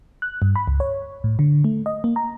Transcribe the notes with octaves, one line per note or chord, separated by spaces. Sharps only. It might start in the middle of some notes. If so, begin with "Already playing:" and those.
F#6
G2
B5
C#2
C#5
A2
D3
A3
D#5
A#3
A#5